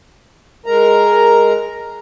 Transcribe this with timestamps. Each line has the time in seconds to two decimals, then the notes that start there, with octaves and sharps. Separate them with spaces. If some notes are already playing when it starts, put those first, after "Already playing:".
0.66 G#3 A#4 A#5